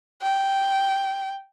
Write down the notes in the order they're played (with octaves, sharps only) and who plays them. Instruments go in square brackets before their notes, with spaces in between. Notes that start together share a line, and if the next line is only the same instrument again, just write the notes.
[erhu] G5